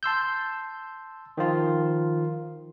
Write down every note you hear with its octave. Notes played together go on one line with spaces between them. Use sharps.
A5 C6 E6 G6
D#3 F3 F4